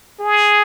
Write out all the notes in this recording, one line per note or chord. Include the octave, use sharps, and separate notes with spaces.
G#4